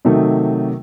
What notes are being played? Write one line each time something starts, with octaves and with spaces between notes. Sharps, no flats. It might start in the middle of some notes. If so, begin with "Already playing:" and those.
C3 D#3 F#3 A3 D#4